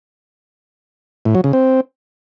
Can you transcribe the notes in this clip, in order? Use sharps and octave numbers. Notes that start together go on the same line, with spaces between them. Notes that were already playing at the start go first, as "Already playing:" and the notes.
A2
F#3
C#3
C4